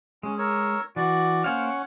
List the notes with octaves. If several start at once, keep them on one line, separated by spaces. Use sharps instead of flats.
G#3 C#4
A#4 C#5 E6
E3 F#4 D5
A#3 C#4 C5 C#5 F5 F#5